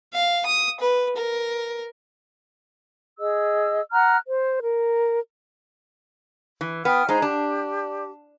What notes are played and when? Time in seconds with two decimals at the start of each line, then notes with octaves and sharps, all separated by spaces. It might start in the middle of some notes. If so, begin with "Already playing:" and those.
0.13 F5
0.46 D#6
0.80 B4
1.16 A#4
3.19 G#4 D#5 E6
3.92 F#5 A#5 F6 F#6
4.27 C5
4.61 A#4
6.61 E3
6.85 B3 G5 D#6 F6
7.09 G#3 D#4 C5 A#5
7.22 D4 G4